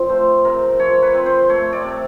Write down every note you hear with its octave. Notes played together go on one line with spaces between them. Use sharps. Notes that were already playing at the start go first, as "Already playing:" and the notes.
Already playing: F3 C4
A3 C5
C3 A#4
F3 C#5
B4
C4
C5
A3 C#5
D5
C3